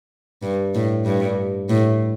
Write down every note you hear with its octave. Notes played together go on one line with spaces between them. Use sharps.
G2
A2
G2
A2